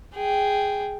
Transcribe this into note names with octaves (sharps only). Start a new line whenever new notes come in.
G#4 G5